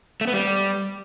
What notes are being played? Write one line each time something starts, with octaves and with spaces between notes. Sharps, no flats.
A3
B3
G3